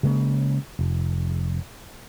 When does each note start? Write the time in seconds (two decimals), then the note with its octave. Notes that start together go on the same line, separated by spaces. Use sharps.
0.03 C#3 G#3 A#3
0.79 F1